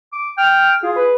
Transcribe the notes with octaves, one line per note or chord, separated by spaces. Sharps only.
D6
G5 F6
F4 G#4
B4